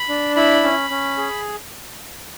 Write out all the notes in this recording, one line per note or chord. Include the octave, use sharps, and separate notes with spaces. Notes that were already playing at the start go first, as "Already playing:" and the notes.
Already playing: B5
D4
E4 B5
C#4
C#4
G#4